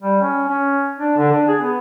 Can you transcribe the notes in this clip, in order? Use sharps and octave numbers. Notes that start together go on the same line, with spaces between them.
G3
C#4
C#4
D4
D3
D4
G#4
B3